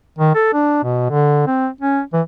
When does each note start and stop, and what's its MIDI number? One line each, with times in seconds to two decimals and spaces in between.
0.19 0.33 51
0.35 0.51 69
0.53 0.81 62
0.83 1.06 47
1.10 1.45 50
1.47 1.69 60
1.81 2.01 61
2.13 2.22 52